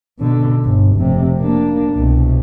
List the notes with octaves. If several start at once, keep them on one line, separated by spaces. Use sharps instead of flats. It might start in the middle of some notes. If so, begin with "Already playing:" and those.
B2 D3
G1
F1 C3
A#3 D4
C2 B2